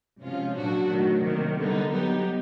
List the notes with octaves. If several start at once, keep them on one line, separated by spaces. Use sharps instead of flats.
C3 F3 G#3 C#4 F4
A#2 F#3 A#3 D4 F#4
D#3 F#3 A3
C3 D#3 F#3 A#3
D3 G3 B3 D#4
F#3 B3 D#4 G4